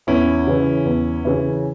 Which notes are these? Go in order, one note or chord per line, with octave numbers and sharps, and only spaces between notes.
E2 C#4 E4
C#3 E3
E2
C#3 E3